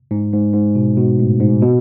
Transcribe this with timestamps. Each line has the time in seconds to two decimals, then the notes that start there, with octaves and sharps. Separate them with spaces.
0.11 G#2
0.33 G#2
0.53 G#2
0.75 B2
0.97 B2
1.19 A2
1.40 G#2
1.62 B2